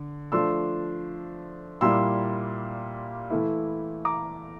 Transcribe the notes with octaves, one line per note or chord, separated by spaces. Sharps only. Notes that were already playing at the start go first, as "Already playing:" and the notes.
Already playing: D3
F3 A3 D4 C6 E6
A#2 G3 A#3 E4 C6 E6
E3 A3 E4
A#5 D6